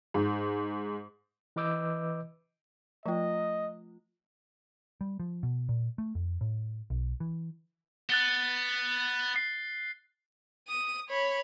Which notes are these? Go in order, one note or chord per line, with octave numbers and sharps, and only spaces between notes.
G#2
E3 B4 D#5 D6 E6 G6
F3 A3 F4 D#5 G5
G3
F3
B2
A#2
A3
F2
A2
B1
E3
B3 F#6 A6 G7
C7
D#6 D#7
C#5 B5